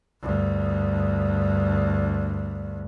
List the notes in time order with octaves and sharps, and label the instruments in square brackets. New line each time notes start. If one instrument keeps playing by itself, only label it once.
[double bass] D2 G2